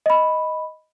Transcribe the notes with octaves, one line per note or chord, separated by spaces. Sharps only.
D#5 B5